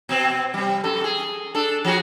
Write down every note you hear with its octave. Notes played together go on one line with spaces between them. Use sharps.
B2 C4
C3 G3
F#2 A4
G#4
D4 A4
F3 F#4 G#4